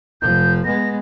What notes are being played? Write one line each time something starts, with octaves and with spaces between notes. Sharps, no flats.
F1 F3 G6
G#3 B3 A#6